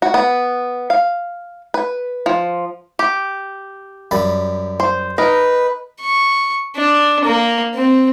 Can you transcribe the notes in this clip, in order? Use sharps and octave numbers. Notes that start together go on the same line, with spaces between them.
F#4
B3
F5
B4
F3
G4
F#2 G3 B5
C5
D#4 A#4 B4
C#6
D4
A#3
C4